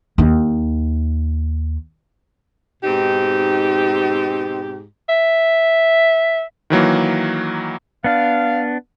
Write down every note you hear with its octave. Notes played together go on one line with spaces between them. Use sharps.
D#2 D#4
G#2 B2 C4 D#4 G4
E5
D#3 E3 F#3 A#3
B3 D4 F5